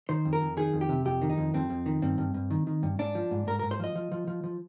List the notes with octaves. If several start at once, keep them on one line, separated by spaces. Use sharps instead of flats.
D#3 C5
F2
A#4
F2
D#3 G#4
F2
G4
C3
F2 G4
D#3
D#4
F2
F2 C4
F2
D#3
G2 C4
G2
G2
D#3
D#3
G2
G#2 D4
F3
G#2
G#2 A#4
G#2 A#4
C5
F3 D#5
F3
F3
F3
F3